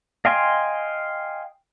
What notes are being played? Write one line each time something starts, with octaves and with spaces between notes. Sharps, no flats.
D#5 F5 G5 G#5 C6